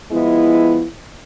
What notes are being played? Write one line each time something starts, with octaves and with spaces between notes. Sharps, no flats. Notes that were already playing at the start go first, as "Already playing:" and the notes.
F3 G#3 B3 E4